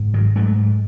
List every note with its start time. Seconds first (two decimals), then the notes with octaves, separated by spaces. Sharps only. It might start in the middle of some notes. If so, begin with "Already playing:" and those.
Already playing: G#2
0.14 D#3 F#3
0.35 G#2 F#3 A3